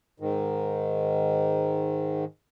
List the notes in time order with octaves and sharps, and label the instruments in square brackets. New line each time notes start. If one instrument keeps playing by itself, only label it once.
[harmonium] G#2 D#3